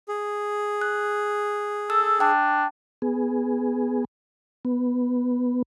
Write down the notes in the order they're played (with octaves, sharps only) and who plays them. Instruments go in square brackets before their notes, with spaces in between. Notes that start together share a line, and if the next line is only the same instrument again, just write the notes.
[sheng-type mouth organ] G#4
[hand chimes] F#6
[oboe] A4 [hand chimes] E6
[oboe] D4 [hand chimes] G5 A5
[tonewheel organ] B3 G#4
B3